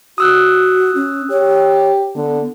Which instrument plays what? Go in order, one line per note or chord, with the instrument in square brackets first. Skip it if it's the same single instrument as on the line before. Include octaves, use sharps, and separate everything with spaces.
[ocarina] F#4 [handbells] D#6 E6 F#6
[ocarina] C#4
[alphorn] G4 [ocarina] C#5
[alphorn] D3 [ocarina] B3